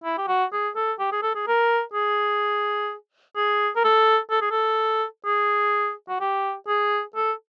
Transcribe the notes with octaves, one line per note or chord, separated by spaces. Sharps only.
E4
G4
F#4
G#4
A4
G4
G#4
A4
G#4
A#4
G#4
G#4
A#4
A4
A4
G#4
A4
G#4
F#4
G4
G#4
A4